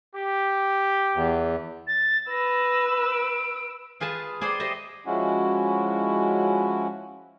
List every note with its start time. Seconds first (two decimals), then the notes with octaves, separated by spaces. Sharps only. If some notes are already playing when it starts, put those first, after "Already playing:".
0.14 G4
1.15 E2
1.87 A6
2.30 B4 E6 A#6
3.12 D7
4.00 F4 G#4 B4 G#5 A5
4.41 G#4 C5 D5 G5
4.60 G4 C5 D#5 E5
5.06 F3 G#3 C#4 E4 F#4